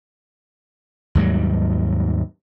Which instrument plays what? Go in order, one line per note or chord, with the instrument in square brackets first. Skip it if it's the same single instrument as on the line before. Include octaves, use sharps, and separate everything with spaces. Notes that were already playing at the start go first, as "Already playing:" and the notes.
[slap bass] D#2 G#2 F#3 G3